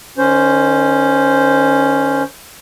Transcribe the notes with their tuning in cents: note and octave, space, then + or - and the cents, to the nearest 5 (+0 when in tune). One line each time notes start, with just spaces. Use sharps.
D#3 -30 C#4 +0 C5 +0